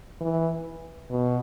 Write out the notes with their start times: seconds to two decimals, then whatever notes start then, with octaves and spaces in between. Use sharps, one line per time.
0.21 E3
1.11 B2